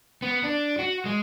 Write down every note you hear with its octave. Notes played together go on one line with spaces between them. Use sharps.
B3
D4
F#4
G#3